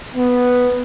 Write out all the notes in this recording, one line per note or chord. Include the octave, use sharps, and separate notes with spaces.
B3